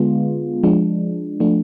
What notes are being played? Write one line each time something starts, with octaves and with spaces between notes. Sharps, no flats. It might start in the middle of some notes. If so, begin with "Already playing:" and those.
Already playing: D3 G#3 B3 F4
F3 G#3 D4
F3 A3 D4